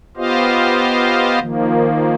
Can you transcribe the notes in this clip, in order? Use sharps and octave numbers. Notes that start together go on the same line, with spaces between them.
B3 F4 G4 C5 D#5 F5
D#3 F3 A#3